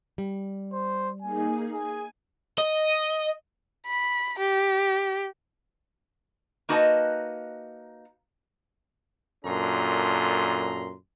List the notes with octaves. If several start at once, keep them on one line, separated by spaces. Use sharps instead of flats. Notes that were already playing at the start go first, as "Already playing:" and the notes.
G3
C5
A#3 D#4 G#4 G#5
G#4 G#5
D#5
B5
G4
A#3 D#4 F#4 B4 D#5 A5
F#2 A#2 D4 A4 A#5 C6